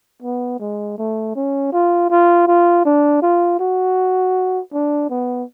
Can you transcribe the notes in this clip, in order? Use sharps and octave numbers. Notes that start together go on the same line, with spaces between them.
B3
G#3
A3
C#4
F4
F4
F4
D4
F4
F#4
D4
B3